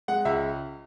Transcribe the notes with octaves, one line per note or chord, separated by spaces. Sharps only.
G#3 F#5
C#2 E5